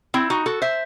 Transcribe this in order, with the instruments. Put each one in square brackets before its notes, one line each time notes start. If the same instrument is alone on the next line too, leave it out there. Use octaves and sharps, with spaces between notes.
[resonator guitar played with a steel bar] C4 E4
D#4 F#4
F#4 A4
C5 E5